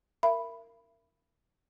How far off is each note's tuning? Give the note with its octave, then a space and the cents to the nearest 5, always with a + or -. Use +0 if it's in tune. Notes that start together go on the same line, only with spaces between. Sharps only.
A#4 -15 E5 +30 B5 +0